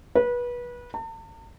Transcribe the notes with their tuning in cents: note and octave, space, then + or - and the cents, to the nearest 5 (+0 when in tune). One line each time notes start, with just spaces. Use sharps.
B4 -25
A5 +45